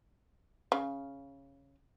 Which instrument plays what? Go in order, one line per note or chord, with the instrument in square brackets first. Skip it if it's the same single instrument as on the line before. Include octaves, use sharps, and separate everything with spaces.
[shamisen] C#3